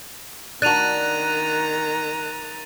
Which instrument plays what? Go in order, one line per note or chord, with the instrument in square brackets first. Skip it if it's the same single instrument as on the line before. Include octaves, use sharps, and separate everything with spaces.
[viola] D#3 A#5 [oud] D4 F#4 [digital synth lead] F#6 [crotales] A6 D#7 F7